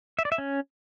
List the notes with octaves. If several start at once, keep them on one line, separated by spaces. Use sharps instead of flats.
E5
D5
E5
C#4